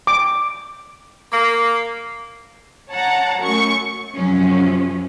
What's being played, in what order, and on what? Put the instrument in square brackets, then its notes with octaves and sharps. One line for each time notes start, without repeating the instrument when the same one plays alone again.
[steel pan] D6
[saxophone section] A#3
[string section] C#5 F#5 A5 A#5
F#2 A3 C#6 C#7
[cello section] F#2 C3 F3 F#3 C#4